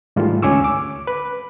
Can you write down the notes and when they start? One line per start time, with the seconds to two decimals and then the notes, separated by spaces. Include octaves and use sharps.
0.16 G#2 D#3 E3 G3 A3 F4
0.42 D2 C#4 G#5 C#6 D6 E6
0.64 D6
1.07 B4